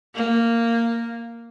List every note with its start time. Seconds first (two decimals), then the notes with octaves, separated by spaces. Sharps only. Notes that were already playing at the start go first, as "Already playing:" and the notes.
0.15 A#3